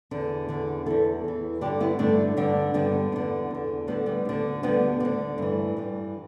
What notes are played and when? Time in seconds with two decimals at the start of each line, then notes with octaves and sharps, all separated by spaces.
0.11 E2 D3
0.48 E2 D3
0.86 E2 E3 E4 A4
1.24 E2 E3
1.61 D3 D4 G4
1.65 G2
1.80 B3 E4
1.99 G2 D3 A3 D4
2.37 G2 D3
2.74 G2 D3 G3 B3
3.12 E2 D3 G3 B3
3.51 E2 D3
3.87 D2 D3 G3 B3
4.06 G3 B3
4.25 D2 D3
4.63 D2 D3 G3 B3
5.00 D2 D3
5.38 G2 E3 A3
5.77 G2 E3